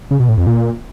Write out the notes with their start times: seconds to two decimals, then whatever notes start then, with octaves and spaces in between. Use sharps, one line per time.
0.11 C#3
0.20 B2
0.29 A2
0.38 F2
0.47 A#2